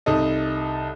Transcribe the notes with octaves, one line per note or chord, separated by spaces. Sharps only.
C2 D#4 A4 D#5